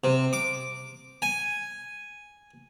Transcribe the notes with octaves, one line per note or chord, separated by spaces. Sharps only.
C3
D6
G#5